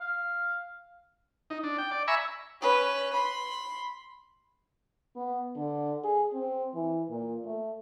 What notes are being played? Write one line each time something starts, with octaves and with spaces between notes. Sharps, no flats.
F5
D#4
D4
G5
D5
E5 G#5 A#5 B5 C#6 E6
C#4 B4
B5 C6
B3
D3
G#4
C4
E3
A#2
A3